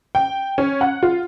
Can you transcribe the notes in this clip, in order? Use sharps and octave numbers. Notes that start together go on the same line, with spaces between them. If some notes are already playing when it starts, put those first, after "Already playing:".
G5
C#4
F#5
F4